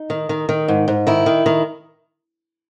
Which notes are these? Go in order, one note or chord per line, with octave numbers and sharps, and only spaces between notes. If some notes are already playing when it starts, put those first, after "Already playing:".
Already playing: D#4
D#3
D#3
D#3
G#2
G#2
D#3 E4
D#3
D#3